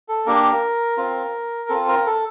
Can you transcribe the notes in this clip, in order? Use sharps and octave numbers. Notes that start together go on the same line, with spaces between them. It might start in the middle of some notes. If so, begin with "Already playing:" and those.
A4
A#3 D4 G4 A#4
C4 F4
C4 F4 A4
A#4
A4